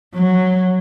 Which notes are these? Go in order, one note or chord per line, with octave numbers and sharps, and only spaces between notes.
F#3